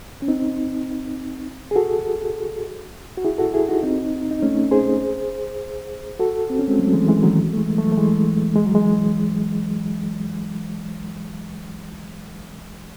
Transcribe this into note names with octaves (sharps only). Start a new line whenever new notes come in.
C#4
C4 D#4
G#4
F#4 A4
F#4
E4 G#4
F#4 A4
E4 G#4
D#4 F#4
C4 D#4
D#4
A3 C#4
G#4 C5
F#4 A4
C4
C#4
G#3 C4
F#3 A3
E3 G#3
E3 G#3
D#3 F#3
A3
E3 G#3
F#3 A3
A3
E3 G#3
G#3
F#3
E3 G#3